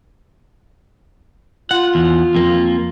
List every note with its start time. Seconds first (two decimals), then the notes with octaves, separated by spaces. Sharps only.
1.71 F4 F#5
1.95 E2
2.35 F2 A#3